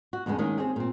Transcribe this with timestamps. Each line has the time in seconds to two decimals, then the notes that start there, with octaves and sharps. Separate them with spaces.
0.13 F#4
0.26 E2 C#3 G#3 B3 D4
0.39 D#3 G#3 A#3 C#4 D#4
0.58 C4 C#4 G4 G#4
0.76 A#2 C4